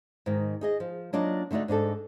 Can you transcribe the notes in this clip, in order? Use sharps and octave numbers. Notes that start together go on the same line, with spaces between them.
G#2 D#3
D#4 G#4 D#5
F3
F#3 A#3 D4 D#4 F4 D#5
D3 A3 D#4 F#4 D5
G#2 D4 D#4 A4